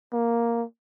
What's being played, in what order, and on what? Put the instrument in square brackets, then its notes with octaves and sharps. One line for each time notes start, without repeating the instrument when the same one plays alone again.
[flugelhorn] A#3